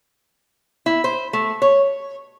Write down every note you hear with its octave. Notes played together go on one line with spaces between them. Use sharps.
E4
C5
A3
C#5